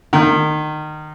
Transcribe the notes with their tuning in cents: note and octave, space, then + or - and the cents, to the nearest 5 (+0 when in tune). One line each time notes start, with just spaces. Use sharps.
D#3 -25